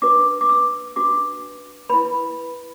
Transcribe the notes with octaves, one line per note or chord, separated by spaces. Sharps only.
D4 F#4 B4 D6
D6
E6
D4 F#4 B4 D6
E4 B4 B5